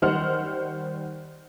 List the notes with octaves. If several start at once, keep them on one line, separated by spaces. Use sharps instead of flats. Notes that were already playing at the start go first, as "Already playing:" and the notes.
D#3 G3 D#4 C5 F#5 F6